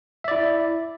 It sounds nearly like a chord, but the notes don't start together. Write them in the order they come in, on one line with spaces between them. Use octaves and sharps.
E5 D5 E4